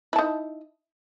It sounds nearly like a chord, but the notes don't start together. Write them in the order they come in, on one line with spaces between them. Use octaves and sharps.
E4 A5 D#4